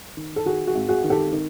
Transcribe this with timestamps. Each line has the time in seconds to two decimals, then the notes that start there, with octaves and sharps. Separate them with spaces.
0.17 D#3
0.36 A4
0.45 D#3 F#4 G#4
0.67 F#4 G#4
0.75 G#1
0.89 F#4 G#4
1.04 D#3
1.10 G4 A4
1.33 D#3